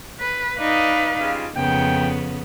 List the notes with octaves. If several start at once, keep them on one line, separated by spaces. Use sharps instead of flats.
B4
D#4 B4 D5 D#5 F5
C#3 G3 F4
F2 A#2 C#3 B3 G5